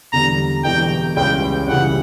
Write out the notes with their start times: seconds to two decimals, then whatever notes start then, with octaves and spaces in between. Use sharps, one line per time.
0.12 E1 E2 D3 G3 A#5
0.64 E1 E2 D3 G3 G5
1.16 C#2 C#3 E3 G3 C#4 G5
1.67 C#2 C#3 E3 G3 C#4 F#5